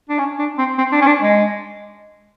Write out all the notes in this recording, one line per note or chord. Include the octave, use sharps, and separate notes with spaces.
D4
C#4
D4
C4
C4
D4
C#4
D4
G#3